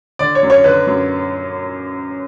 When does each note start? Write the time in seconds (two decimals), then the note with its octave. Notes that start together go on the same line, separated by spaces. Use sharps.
0.19 D3 D5
0.35 C#5
0.43 F#2
0.50 C#5
0.64 D3 B4
0.87 F#2